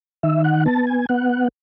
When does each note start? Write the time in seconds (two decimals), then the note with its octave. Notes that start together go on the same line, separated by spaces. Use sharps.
0.23 D#3 E5
0.44 F#5
0.66 B3 A5
0.87 G#5
1.09 B3 F#5